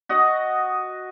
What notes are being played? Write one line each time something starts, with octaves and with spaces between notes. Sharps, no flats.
F#4 D#5